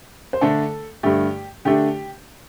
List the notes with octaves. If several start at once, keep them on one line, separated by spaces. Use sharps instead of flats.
C5
D3 A3 D4 A4
G2 D3 A3 G4
D3 A3 D4 G4